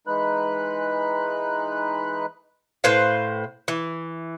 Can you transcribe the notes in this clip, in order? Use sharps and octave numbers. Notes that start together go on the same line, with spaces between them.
E3 G#3 D#4 B4 B5 F#6
A2 B4 C5 F5
E3